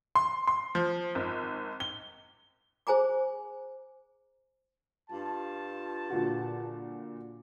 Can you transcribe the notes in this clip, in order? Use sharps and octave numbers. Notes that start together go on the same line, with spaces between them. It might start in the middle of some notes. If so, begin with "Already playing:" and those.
C6
C6
F3
G#1
G7
G#4 C5 G#5 A#5 D6
G2 F4 A5
A#2 D3 F#4